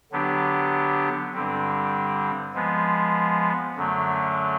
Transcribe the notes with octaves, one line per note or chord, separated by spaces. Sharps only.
D3 F#3 B3 D4 G4
G2 D3 G3 C4
F3 G#3 B3
F#2 D3 F#3 A3